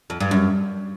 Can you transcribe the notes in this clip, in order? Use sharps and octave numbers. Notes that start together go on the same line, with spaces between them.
F2
G2
F#2